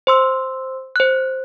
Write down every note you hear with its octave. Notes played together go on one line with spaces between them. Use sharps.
C5 C6 E6
C5 F#6